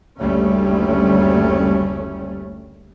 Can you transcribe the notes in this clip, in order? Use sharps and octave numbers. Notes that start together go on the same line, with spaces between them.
F#1 D2 G3 A3 C#4